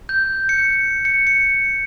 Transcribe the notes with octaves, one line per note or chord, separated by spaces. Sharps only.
G6
C#7
C#7
C#7